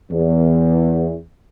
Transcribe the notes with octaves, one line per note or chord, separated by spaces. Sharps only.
E2